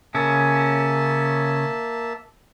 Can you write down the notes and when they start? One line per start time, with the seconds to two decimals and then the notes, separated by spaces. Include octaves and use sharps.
0.15 C#3 A#3 C#4 E5 A5